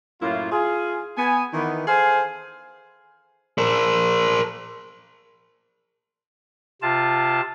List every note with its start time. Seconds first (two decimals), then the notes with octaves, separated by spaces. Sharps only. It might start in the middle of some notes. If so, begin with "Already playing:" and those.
0.21 F#2 A2 A#3 E4 F4
0.52 F4 G#4
1.18 B3 G#5
1.53 D#3 E3 B3
1.87 G#4 A4 C5 F5 G#5
3.58 A#4 C5
6.82 C3 F4 A5